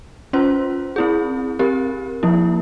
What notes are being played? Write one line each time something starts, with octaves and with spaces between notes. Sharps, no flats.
C#4 F4 C5
C4 E4 G#4
C4 G4 A#4
F3 A#3 E4